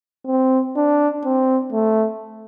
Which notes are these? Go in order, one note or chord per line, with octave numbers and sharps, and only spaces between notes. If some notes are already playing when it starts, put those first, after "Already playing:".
C4
D4
C4
A3